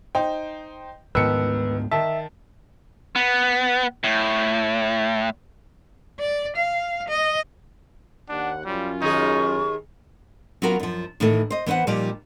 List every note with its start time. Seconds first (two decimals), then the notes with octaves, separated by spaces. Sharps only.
0.15 D#4 C5 G5
1.15 D2 G#2 D#3 F3 B3 B4 E6 C#7
1.91 D#3 E5 A5
3.16 B3
4.04 A2
6.20 D5
6.56 F5
7.08 D#5
8.29 D#2 D4 F#5
8.65 F#2 G3 C#4 F4
9.02 D#2 D#4 G#4 C#6
10.62 F#3 B3 C#4 F4 F#4 A#4
10.80 F#2 F3
11.20 A2 D#3 E3 A3
11.50 C5 D#5
11.66 E3 B3 B4 C5 F#5
11.87 A#2 F3 G3 D#4 F4 G4